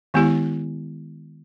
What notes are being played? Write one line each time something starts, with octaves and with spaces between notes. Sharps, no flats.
D#3 G#3 B3 E4 G4